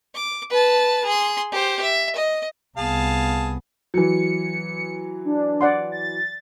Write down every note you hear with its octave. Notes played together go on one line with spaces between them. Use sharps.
D6
B4 A5
G#4 C6
G4 C5
E5
D#5
C2 B3 G#4 F5 A5
E3 F#3 C#7
D4
D5 F#5 C6
A6